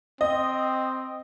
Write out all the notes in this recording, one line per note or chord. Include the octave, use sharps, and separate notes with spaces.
C4 D#5